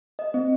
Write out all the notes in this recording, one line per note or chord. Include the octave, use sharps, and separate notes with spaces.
D#5
C4